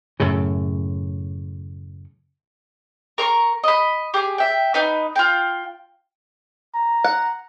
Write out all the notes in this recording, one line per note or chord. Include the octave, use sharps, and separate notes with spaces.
F#2 A2 C#3
A#4 A#5 C6 C#6
D#5 B5
G4 G#4
E5 G5
D#4 B4
F4 G5
A#5
F#5